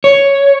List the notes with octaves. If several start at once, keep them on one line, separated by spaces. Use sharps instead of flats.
C#5